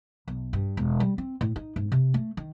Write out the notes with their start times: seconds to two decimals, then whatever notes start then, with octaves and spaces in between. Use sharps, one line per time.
0.28 B1
0.53 G2
0.77 E1
1.00 G3
1.18 C4
1.41 A2
1.56 D#4
1.76 G#2
1.92 C3
2.14 A3
2.37 D#3